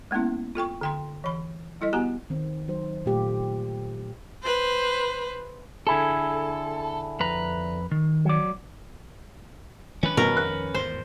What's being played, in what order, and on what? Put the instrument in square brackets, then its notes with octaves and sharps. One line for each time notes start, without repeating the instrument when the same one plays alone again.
[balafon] G#3 A#3 B3 C#4 E4
F4 A4 G5 C#6
D3 G5 C6
E3 B5
G3 E4 A4 D#5
B3 F#4 G4 G#5 A#5
[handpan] D#3 C4
F#3 D#4 C5
A#2 F#3 A3 F4 G4
[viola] B4 C5
[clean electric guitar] D3 E4 G#4 [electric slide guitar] A4
[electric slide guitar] F2 B4 A#5
D#3
[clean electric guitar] F#3 D5
[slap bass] D#3 G3 D4 [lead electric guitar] C#4 B4
[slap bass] F2 D#3 G3 [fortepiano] B2 [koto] A#4
[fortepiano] F#6
[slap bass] G#1 E2 A2 [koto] C5